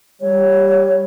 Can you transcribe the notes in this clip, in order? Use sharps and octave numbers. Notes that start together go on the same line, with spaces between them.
G3 C#5